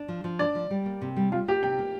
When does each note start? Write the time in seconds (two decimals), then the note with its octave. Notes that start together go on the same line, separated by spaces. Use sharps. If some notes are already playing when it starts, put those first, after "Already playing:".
Already playing: D4
0.08 F3
0.24 F3
0.39 D4 D5
0.55 F3
0.71 G3
0.86 A#3
1.02 C3
1.17 G3
1.32 G3 F4
1.48 A#3 G4
1.63 C3 G5
1.79 A#3